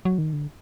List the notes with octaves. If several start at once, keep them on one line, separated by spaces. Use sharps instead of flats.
F#3
D#3
D3